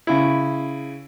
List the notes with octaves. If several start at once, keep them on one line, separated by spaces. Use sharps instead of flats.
C#3 E4